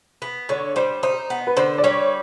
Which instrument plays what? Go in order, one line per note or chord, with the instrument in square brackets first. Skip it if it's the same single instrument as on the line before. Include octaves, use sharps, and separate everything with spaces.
[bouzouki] B3
[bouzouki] D3 [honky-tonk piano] C#5
[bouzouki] G3 [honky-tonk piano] C5
[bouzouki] D#4 [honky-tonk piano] C5
[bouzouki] B3
[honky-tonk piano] B4
[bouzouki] D3 [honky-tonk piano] C5
[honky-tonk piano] D5
[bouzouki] G3 [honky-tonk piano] C#5